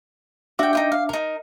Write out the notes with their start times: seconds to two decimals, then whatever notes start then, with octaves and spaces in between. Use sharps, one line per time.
0.59 D4 F#4 E5 G5 D6
0.73 D#4 F4 G5
0.92 F5
1.09 D#4 A#4